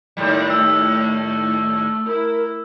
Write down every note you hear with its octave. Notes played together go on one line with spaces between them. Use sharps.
D#2 A2 G3
A3 E6
E4 A#4